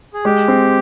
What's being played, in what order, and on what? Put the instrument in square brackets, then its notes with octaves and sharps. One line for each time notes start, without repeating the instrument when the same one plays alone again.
[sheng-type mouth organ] G#4
[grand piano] G#3 [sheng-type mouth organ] G4
[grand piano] C4